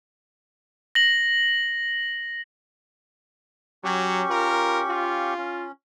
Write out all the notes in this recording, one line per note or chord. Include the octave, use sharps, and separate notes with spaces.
A#6 F#7
F#3 C#4 G4 C#6
F4 A#4
F4
C#4